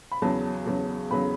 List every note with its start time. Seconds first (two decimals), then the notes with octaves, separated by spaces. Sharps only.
0.12 B5
0.22 E2 C#3 F#3 A5
0.66 E2 C#3 F#3
1.10 E2 C#3 F#3 B5